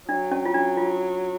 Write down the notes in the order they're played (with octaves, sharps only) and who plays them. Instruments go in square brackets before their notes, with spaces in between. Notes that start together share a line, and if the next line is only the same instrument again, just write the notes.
[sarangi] F#3 [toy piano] D4
[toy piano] C#4
F4
D4
F4